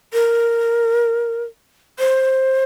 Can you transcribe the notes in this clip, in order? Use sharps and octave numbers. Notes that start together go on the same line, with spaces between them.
A#4
C5